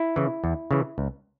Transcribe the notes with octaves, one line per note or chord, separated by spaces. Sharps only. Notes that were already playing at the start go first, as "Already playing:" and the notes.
Already playing: E4
C#3 E3
E2
C#3 E3
C#2